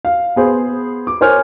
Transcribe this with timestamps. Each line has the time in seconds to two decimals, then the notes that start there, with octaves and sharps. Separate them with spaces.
0.05 F5
0.36 B3 G#4 C5
1.07 D6
1.21 A#4 C5 C#5 G#5 F6